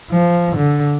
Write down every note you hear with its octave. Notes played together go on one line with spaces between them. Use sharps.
F3
D3